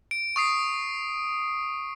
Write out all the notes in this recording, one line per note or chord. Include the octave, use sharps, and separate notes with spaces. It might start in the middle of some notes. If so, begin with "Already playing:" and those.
D7
C#6 D#6 C7